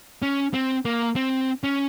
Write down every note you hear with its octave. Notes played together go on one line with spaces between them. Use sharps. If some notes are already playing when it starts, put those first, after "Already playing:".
C#4
C4
A#3
C4
C#4